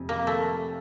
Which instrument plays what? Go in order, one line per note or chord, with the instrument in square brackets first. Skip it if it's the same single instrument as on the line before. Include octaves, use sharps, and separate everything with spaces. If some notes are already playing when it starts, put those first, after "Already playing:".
Already playing: [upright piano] F1 F2 C3
[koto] A#3
A3